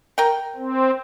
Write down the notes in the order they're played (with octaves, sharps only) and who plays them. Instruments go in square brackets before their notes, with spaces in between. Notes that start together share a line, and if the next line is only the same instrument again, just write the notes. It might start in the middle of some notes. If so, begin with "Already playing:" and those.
[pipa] A#4 G5
[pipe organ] C4